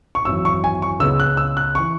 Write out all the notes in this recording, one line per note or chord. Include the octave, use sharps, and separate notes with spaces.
C#6
G#1 F#2 E3 E6
C#6
G#5
C#6
C#2 C#3 G#3 B3 E6
F#6
E6
F#6
E3 C#6